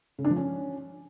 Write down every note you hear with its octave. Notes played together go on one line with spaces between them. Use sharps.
C#3
D4
F3
C#4